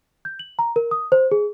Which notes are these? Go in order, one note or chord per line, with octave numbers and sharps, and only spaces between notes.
G6
F#7
A#5
A#4
D#6
C5
G#4